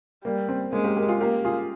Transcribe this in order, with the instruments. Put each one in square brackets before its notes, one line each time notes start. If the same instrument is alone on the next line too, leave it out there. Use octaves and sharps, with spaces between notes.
[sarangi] G3 [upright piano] A#3
[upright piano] C4
[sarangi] G#3 [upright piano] A#3 C#4
[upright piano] G4 A#4
G4 A#4
F4 G#4
[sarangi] A#3 [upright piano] G4 A#4
[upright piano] F4 G#4